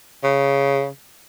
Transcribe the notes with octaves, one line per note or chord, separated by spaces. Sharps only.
C#3